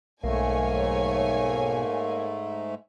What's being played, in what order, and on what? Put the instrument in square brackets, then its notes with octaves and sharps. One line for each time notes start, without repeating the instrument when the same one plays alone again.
[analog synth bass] B1 [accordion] G#2 A3 [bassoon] A#3 [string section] C#5 G#5